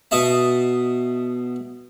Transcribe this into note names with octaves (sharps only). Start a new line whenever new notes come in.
B2 D#5 E5 A5